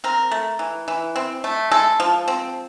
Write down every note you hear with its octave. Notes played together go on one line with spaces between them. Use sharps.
C4 A#4
A3
E3
E3
C4
A3
G#3 A4
F3
C4